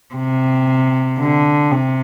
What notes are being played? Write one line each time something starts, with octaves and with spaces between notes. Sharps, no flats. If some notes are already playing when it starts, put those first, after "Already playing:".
C3
D3
C3